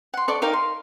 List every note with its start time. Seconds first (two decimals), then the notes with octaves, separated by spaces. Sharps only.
0.14 F#5 C6
0.28 A4 D5 C#6
0.42 D#4 A#4 F5 G5
0.53 C6